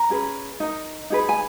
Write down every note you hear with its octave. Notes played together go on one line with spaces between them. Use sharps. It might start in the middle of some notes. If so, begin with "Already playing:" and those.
Already playing: A#5
C#4 G#4 B4
D#4 A#4
D#4 G#4 B4
G#5